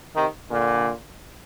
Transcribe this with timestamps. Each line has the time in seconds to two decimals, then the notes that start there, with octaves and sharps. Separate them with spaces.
0.14 C3 D#3
0.49 A#2 D3